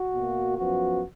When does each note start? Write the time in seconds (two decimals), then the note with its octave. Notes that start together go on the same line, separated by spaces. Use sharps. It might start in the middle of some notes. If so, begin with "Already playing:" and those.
Already playing: F#4
0.14 B2 A#3
0.57 F#2 F3 B3 F#4